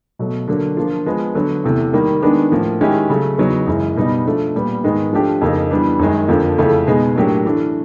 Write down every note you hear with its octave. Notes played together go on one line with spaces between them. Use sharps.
B2 F#3 A3
D3 F#3 A#3 D4
F3 A#3 D4 F4
F3 G#3 B3
D3 F#3 B3
E2 C3 E3 A3
D#3 G3 A#3
D#3 G#3 B3 D4
A2 F3 A#3
D#3 G#3 C#4 E4 G4
C#3 F#3 A3
E2 C#3 F#3 B3 D#4
F#2 C#3 E3 G#3
B2 G3 B3 D#4
F3 A3 D4
A#2 G3 B3
G#2 D#3 G#3 B3 D#4
F3 A3 D4 G4
F2 C#3 F3 A#3 D#4
E3 G3 B3 D4
F#2 D#3 G#3
F2 D3 F3 A#3
F2 C#3 E3 A3
B2 G#3 B3 D#4 G#4
A2 F#3 A#3 D4 G4
E3 A3 D4